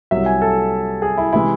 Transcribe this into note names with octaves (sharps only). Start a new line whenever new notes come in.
C2 C3 F#3 E5
G#5
A4
G#4
E4
C3 E3 G#3 E4